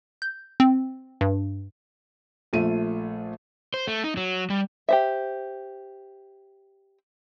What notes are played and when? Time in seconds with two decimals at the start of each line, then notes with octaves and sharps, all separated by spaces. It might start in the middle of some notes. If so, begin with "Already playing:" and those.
0.22 G6
0.60 C4
1.21 G2
2.53 A#1 A3 F4 D#7
3.74 C5
3.87 A3
4.04 D#4
4.17 F#3
4.50 G3
4.89 G4 C5 E5